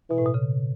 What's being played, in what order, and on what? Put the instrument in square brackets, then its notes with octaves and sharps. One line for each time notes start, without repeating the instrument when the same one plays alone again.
[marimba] B2 [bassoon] E3
[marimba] A2
B2
C#3